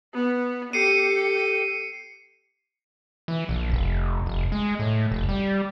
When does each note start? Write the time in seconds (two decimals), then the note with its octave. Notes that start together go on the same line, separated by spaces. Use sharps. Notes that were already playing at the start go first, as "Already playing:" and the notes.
0.14 B3
0.73 G4 A4 C7 C#7 D#7
3.28 E3
3.49 A#1
3.72 F1
4.26 F1
4.52 G#3
4.79 A2
5.11 F1
5.29 G3